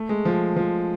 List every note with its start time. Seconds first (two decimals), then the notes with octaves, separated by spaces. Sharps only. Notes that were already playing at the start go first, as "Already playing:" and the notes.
Already playing: A3
0.09 G#3
0.25 F3
0.56 F3